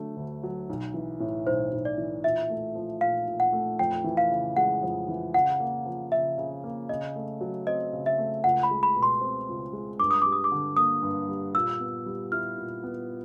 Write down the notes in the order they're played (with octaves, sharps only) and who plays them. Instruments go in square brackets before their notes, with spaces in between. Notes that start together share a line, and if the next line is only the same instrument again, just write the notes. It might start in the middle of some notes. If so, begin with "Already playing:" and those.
Already playing: [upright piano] D3 F#3 A3
D2
F#3
B1
E3
A2
[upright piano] B1 [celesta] C5
[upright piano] B1
[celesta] D5
[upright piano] E3
[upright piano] A#2 [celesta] E5
[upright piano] A3
F3
[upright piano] A#2 [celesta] F5
[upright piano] A#2
[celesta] F#5
[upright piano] A3
[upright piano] F2 [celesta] G5
[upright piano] E3
[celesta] F5
[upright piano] C#3
[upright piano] G#3 [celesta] F#5
[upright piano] F2
E3
[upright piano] C#3 [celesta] F#5
[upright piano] A#3
F3
[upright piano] C#3 [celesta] E5
[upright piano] C#3
A#3
[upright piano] C#3 [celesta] D#5
[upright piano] A3
F#3
[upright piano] C4 [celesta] D#5
[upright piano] C#3
[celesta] E5
[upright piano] A3
[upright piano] C#2 [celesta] F#5
[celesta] B5
[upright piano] G#3
[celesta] B5
[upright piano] B2
[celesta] C6
[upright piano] C4
C#2
G#3
[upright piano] G2 [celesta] D6
[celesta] D#6
[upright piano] G3 [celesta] D6
[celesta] D#6
D6
[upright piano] D3
[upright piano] A#3 [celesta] D#6
[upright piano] G2
G3
[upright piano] A#2 [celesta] E6
[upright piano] B3
G3
[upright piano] E4 [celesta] F6
[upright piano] A#2
B3